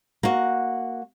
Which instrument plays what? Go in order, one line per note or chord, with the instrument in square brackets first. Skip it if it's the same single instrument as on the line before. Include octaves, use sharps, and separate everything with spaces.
[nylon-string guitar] A#3 F#4